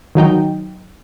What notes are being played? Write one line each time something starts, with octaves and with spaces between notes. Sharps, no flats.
D#3 F#3 D#4 G5